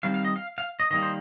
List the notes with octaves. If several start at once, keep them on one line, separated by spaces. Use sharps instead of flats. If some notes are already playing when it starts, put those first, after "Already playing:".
D#3 G3 C4 F5
F5
D#5
F5
F5
D#5
D#3 G3 A#3 D#5
C5